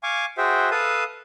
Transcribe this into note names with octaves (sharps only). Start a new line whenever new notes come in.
F5 G#5 C#6 D6
F#4 G#4 C5 E5 G5
A4 B4 F5 A5 D#6